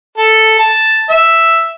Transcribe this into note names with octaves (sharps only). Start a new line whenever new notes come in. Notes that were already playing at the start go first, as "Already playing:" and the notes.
A4
A5
E5